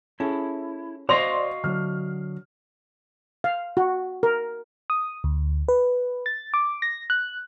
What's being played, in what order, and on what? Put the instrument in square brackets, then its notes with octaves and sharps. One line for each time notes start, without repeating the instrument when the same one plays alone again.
[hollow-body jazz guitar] C#4 G#4 A4 [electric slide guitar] E4
[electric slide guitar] F#4 D#5 F5 [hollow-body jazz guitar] C5 [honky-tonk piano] D5 C6 F7
[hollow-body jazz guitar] D3 F#3 [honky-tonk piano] F6
[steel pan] F5
F#4
A#4
[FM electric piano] D#6
D2
B4
A6
D6
A#6
F#6